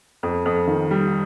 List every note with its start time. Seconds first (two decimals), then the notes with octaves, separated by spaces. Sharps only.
0.23 F2
0.46 F2
0.67 D#3
0.91 G3